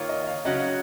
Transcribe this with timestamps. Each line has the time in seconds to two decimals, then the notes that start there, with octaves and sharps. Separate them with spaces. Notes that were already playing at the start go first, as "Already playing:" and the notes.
Already playing: D#3 A#3 F4 C#5
0.09 D#5
0.27 F5
0.45 C#3 F#3 C#4 F#4 D#5